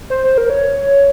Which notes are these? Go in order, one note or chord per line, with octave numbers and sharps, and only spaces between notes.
C5
C5
A#4
C#5